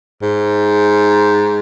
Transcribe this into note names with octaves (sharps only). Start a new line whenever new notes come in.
G#2